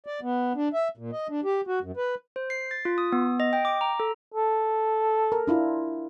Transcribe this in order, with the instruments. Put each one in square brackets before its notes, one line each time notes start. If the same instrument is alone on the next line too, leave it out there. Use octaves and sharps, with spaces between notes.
[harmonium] D5
B3
D4
E5
A#2
D#5
D4
G4
F#4
F#2
B4
[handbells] C5
C7
A6
F4
D#6
B3
D#5
G5
D6
A#5
A4
[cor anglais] A4
[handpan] A#4
D4 E4 F4